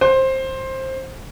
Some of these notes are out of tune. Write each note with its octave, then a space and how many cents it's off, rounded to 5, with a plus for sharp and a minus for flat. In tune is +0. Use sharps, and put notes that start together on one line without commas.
C5 +15